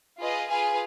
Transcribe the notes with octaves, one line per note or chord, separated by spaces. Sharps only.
F4 G#4 B4 D#5
F4 G#4 B4 F5 G#5